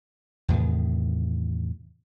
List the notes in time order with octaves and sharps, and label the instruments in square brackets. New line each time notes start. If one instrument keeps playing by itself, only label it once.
[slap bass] E2 A2 C3 D#3